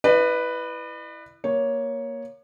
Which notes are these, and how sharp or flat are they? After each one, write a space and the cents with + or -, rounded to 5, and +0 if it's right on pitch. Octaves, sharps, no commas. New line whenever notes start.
E4 +0 B4 +0 D5 +45
A#3 +10 C#5 +0